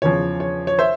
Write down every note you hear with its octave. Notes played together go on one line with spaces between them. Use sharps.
E2 C#3 F3 C#5
C#5
C#5
C5 E5